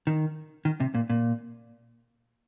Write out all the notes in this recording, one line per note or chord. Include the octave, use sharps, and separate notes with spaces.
D#3
D#3
C3
A#2
A#2